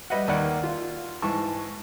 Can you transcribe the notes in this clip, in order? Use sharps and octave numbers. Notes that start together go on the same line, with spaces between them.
G3 B4 D#5 E5 F#5
D#2 A#3 D5 D#5 F#5
F4
G#2 E3 A5 C#6